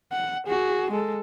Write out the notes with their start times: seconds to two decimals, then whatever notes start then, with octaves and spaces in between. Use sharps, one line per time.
0.12 F#5
0.47 F#4 G#4
0.91 G#3 A4